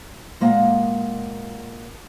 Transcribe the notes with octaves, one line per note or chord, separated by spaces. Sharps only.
A#2 G#3 A#3 D#5 F#5